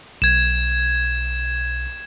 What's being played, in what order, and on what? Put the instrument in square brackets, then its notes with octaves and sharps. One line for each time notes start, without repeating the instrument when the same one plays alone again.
[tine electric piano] B1 [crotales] G#6 E7